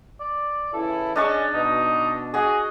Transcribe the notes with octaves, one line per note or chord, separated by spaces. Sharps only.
D5
C#3 E3 E4 A4
C#4 D4 G#4 D#5 A5 C#6
B2 D#4
F#4 G#4 D#5